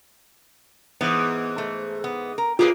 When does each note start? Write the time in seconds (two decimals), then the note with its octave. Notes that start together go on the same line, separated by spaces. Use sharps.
1.01 G#2 E3 B3
1.58 A3
2.04 B3
2.38 A#4
2.59 A2 A#3 F4 G4 G#4 B4